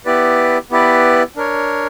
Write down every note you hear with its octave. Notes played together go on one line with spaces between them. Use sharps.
B3 E4 G4 B4 D5
B3 E4 G4 B4 D5
D4 A#4 C#5